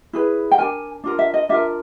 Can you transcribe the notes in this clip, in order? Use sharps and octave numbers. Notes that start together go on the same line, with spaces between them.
E4 G#4 B4
G5
D4 F4 A#4 G#5
D4 F4 A#4
E5
D#5
D4 F4 A#4 E5